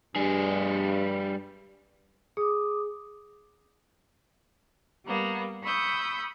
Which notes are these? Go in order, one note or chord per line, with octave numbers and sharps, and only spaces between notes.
G2 G3 G#4
G#4 D6 D#6
G3 A#3 B3
B5 C#6 D#6 E6 G6